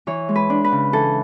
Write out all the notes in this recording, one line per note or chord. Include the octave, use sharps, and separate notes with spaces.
E3 C#5
G#3
B4
D4
B4
C#3
E3 A4